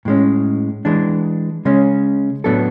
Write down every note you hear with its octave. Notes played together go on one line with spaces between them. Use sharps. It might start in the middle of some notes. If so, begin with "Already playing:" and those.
A2 G#3 C#4
E3 G#3 D4
C#3 G#3 C#4
A2 F#3 B3 D4 A4